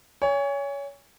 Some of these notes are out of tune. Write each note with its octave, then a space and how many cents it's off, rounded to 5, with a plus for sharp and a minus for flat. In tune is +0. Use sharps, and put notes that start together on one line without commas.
C#5 +25 G#5 -25